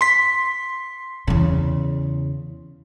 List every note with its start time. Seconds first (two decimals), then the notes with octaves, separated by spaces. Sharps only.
0.01 C6 B6
1.27 E2 C#3